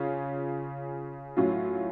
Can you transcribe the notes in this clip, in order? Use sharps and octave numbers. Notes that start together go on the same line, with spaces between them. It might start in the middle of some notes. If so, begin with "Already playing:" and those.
Already playing: C#3 C#4 F4
A2 F#3 C#4 F4